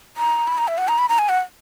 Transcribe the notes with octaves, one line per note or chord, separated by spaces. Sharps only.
A#5
B5
A#5
E5
F#5
A#5
B5
A#5
G#5
F#5